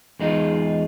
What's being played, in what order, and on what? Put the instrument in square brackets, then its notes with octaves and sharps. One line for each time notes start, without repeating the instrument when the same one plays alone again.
[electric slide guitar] E2 G#3 D#4 F4